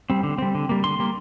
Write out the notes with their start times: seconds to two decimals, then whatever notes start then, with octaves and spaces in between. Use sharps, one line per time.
0.10 G3 C4
0.23 D3
0.38 G3 C4
0.55 D3
0.69 G3 A#3
0.84 D3 C6
0.99 G3 A#3